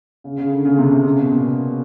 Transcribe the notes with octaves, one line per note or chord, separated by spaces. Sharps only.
C#3
C#3
D3
C#3
C3
C3
C#3
B2
A#2